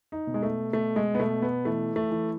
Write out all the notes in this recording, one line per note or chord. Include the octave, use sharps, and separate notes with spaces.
D#4
B2
G#3
A3
B2 A3
G#3
B3
B2 A3
B3
E3 A3
A3
E3